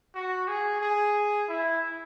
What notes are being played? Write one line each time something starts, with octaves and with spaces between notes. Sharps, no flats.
F#4
G#4
G#4
E4